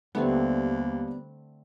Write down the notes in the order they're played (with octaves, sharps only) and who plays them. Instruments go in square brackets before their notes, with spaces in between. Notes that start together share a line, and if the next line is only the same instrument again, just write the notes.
[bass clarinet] D#2 [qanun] D3 A3 C4 [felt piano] G3 D4 [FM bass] B3